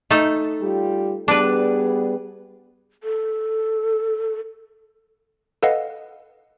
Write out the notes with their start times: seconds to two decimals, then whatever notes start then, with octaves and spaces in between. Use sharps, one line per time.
0.11 A3 D#4 A4
0.61 G3 F4 G4
1.28 G3 B3 D4 G#4 B4
3.04 A4
5.63 A4 B4 D#5 F5 F#5